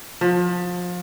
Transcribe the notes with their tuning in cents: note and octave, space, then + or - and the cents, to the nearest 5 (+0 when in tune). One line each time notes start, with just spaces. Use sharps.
F3 +30